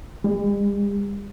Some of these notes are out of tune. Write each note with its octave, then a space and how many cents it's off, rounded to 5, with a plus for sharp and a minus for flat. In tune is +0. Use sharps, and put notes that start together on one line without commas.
G3 +45